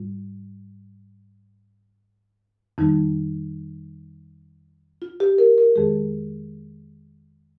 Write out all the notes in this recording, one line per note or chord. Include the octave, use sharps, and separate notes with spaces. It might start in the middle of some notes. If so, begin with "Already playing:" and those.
Already playing: G#2 G3 F4
F2 D#3 G3 D#4
F4
G4
A#4
A#4
F2 D#3 G#3 G#4